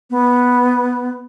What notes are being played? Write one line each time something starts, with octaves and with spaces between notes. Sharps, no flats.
B3